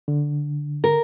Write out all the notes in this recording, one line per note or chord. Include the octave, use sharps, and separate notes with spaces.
D3
A#4